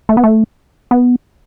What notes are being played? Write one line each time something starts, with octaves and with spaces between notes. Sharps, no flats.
A3
B3
A3
B3